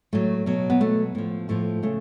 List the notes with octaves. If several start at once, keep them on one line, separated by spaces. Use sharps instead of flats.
A2 F#3 A3
B2 F#3
B3
B2 F#3 A3
A2 F3
A2 F3 A3
C#3 A3